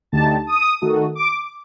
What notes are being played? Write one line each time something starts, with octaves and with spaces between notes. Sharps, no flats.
D2 D3 A3 D#4 G4 A5
D#6
D#3 A3 D#4 F#4 A4
D6